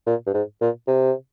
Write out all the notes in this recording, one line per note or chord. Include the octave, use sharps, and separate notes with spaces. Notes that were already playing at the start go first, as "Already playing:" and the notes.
A#2
G2
G#2
A#2
C3